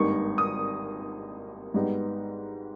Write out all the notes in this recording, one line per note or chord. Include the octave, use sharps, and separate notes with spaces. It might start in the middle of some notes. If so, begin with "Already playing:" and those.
Already playing: G#1 G2 G3 A#3 D#4 C#6
D#6
G#2 G3 B3 D#4